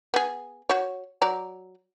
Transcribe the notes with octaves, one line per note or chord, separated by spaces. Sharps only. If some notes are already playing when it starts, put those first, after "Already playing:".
B3 G#4
F#4 C#5
F#3 D5 A#5